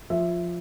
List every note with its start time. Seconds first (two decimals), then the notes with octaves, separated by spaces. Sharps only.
0.10 F3 E5